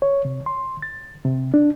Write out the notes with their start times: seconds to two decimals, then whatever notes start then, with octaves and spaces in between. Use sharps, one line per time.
0.02 C#5
0.25 C3
0.46 C6
0.82 A6
1.25 C3
1.54 D4